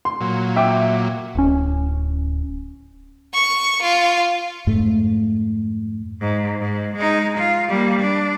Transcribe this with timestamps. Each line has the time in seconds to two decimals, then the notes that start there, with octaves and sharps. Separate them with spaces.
0.05 C6
0.21 A#2 F#3
0.56 E5 G5 D6
1.35 D1 C#4
3.34 C#6
3.82 F4
4.67 F2 G#2 A3
6.21 G#2
6.60 G#2
6.96 G#3 D#4
7.38 F4
7.68 G3 A#3
7.99 D4